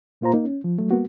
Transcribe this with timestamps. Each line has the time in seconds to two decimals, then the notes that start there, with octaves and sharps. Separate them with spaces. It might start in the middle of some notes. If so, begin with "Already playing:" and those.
0.21 A#2 A#3 F4 C5 A#5
0.33 A#3 D#4
0.45 C#4
0.64 F3
0.78 F#3 A3
0.91 G3 A#3 B3 F#4